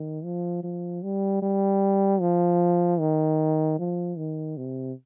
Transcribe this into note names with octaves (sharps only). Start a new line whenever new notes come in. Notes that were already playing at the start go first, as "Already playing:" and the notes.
Already playing: D#3
F3
F3
G3
G3
F3
D#3
F3
D#3
C3